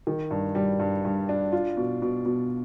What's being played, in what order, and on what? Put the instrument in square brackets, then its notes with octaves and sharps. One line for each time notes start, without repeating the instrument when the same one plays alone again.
[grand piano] D#3
G2
G3
G2
G2
D4
F4
B2
B2
B2